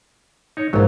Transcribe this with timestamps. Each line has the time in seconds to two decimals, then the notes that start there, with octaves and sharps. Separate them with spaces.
0.57 D#4 C#5
0.73 A#1 G#2 F#3 F4